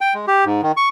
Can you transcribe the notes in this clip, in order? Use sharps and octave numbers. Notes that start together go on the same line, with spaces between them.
G5
G#3
G4
G#2
D#3
C#6